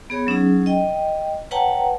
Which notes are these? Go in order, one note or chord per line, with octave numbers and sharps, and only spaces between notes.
B3 G#4 C#5
F#3 C#4 D#4 G#4
D#5 G5
B4 C#5 F#5 G5 A5 A#5